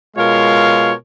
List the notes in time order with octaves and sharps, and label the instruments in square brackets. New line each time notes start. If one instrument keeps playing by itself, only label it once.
[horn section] B2 G#3 F4 A#4 C#5 F5